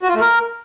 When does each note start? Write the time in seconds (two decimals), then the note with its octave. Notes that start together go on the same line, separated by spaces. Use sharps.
0.03 F#4
0.09 F4
0.15 A3
0.21 A#4